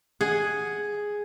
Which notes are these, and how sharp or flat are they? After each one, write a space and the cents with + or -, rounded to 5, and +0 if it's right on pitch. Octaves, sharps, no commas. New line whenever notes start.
G#4 +0 F#5 +0